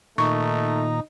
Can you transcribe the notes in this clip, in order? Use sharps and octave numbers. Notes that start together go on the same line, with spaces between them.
A#2 D#3 A3 D#4 A#5 C#6